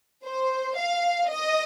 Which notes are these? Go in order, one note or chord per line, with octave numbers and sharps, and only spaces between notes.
C5
F5
D#5